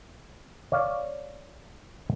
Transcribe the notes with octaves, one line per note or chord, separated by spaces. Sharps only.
C#5 D5 F5